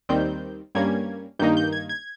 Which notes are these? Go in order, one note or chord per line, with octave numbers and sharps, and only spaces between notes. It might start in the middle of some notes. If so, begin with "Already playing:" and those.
D#2 D#3 G3 C4 G6
G2 G3 A#3 C#4 G#6
G2 D#3 A#3 D#4 G6
G6
G#6
G#6